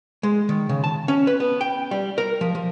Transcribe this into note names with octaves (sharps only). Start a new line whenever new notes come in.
G#3
D#3
C#3
A5
C#4
B4
B3
G5
G3
A#4
F3
F3